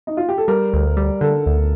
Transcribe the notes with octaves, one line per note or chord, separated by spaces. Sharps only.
D#4
F4
G4
A4
G3 A#4
D2
G3
D3 A4
D2